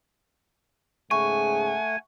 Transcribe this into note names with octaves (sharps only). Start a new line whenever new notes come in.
G#2 C#3 A3 G#4 F#5 G#5 C#6